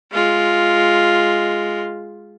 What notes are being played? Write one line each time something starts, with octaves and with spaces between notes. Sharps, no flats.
G#3 F4